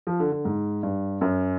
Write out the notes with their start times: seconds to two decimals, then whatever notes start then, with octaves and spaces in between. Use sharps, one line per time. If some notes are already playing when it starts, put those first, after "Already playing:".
0.07 F3
0.20 D3
0.32 D3
0.45 G#2
0.83 G2
1.21 F#2